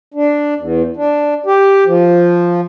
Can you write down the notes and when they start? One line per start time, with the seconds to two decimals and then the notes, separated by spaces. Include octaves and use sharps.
0.14 D4
0.58 E2
0.96 D4
1.46 G4
1.86 F3